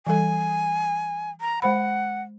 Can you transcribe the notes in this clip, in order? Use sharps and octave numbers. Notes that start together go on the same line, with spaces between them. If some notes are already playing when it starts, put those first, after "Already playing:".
E3 G3 A4 G#5
A#5
G#3 C5 F#5 B5